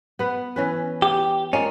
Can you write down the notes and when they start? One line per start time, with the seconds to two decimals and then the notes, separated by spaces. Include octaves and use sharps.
0.19 B3 B4
0.56 E3 C#4 B4
1.02 G4
1.53 G#3 A#3 C#4 F4